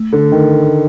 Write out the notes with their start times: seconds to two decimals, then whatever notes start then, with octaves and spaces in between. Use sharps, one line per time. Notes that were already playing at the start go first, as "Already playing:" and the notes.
Already playing: A3
0.12 D3
0.32 D#3